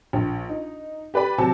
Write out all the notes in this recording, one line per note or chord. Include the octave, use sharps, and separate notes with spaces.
A#1
D#4
G4 B4 D5 B5
C3 F#3 A5